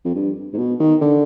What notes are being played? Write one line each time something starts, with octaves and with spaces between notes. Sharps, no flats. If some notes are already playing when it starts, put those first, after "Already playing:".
F2
G2
G#2
B2
D#3
D3